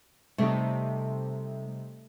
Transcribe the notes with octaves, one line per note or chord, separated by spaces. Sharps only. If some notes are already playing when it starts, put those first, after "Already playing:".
C3 G3 A3 D#4